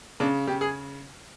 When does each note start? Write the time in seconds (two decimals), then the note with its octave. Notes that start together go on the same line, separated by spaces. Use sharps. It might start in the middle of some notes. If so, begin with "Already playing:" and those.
0.20 C#3 D4
0.48 C#3 G4
0.61 G#4